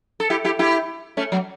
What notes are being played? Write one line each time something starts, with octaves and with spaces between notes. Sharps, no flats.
A4
E4 G4
E4 G4
E4 G4
A3 C#4
F#3 A3